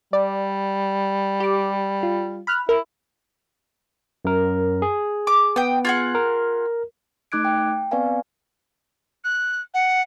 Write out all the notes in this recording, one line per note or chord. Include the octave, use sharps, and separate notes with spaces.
G3 D5
G4 D6
F4
B5 F6 F#6
E4 A#4
F#2 A#4
G#4
D6
B3 G5 D#6
F4 G#4 F#5
A#4
A3 D#4 D6 F#6 G#6 D7
G5
B3 C4 B4 D5 F5 G#5
F#6
F#5